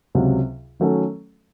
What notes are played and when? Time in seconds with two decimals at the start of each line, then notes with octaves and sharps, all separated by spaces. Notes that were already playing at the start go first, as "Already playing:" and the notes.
0.15 C#2 C3 F#3
0.80 D#3 F#3 A3 C#4 A4